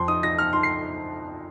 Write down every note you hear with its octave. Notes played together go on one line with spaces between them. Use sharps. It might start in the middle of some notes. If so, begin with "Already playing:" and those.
Already playing: F2 C6
D#4 D#6
D#4 A#6
D#4 F6
D#4 C6
C7